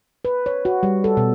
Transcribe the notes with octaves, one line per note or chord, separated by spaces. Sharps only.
B4
C#5
F#4
G3
A4
B2